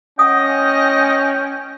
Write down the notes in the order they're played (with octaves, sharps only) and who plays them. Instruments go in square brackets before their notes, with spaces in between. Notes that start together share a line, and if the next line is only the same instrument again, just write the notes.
[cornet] C#4 [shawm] D#5 [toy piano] F#5 D#6 [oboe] G5